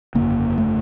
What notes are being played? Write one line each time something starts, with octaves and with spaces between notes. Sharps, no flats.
G1 F2 C#3 A#3
A3